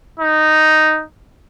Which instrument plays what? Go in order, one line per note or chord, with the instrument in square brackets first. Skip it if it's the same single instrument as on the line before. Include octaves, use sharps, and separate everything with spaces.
[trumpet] D#4